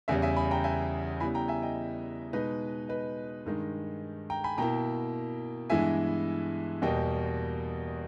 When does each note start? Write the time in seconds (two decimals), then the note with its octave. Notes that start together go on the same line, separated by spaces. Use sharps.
0.08 E2 C#3 G3 E5 G#5
0.22 E5 G#5
0.36 G#5 B5
0.51 G5 A#5
0.64 E5 G#5
1.20 C#3 G3 B3 E4 G#5 B5
1.35 G5 A#5
1.48 E5 G#5
1.62 D#5 G5
2.33 B2 G#3 D#4 B4 D#5
2.89 B4 D#5
3.46 G2 D#3 G#3 D#4
4.30 G5 A#5
4.44 G#5 B5
4.58 B2 A#3 E4 G5 A#5
5.70 G2 E3 G#3 B3 E4 E5 G#5
6.82 E2 B2 G3 A#3 D#5 G5